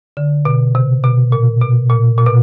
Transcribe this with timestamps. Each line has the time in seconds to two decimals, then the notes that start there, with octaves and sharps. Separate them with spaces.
0.17 D3
0.45 B2
0.75 C3
1.04 B2
1.32 A#2
1.61 B2
1.90 A#2
2.18 A#2
2.26 B2